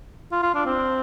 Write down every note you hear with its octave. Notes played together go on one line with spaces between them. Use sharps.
F4
F4
D4
C4